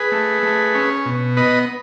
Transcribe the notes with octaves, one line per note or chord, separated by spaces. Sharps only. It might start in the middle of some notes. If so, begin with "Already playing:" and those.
Already playing: G#4 B4
A3
A3
C#4
B2
B3 B4 D#5